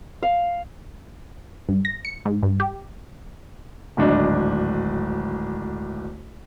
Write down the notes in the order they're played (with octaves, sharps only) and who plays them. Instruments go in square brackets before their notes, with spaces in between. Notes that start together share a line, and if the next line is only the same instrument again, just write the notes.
[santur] F5
[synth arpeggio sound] G2
A#6
C#7
G#2
G2
G4
[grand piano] D1 G#1 D4 D#5